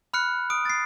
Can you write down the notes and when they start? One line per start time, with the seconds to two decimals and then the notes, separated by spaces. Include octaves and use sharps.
0.13 B5 F6 F#6 C#7
0.50 D#6 D7
0.65 A6 C7